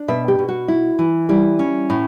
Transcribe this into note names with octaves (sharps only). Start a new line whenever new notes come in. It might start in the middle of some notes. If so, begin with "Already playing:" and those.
Already playing: D4
B2 E5
G4
B2
F#4
E4
E3
G3 E4
C#4
A2